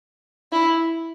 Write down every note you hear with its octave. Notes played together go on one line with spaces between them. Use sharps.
E4